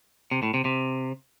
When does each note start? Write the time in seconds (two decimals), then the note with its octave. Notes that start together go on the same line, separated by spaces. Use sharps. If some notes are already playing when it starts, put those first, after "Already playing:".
0.31 C3
0.43 A2
0.54 C3
0.65 C3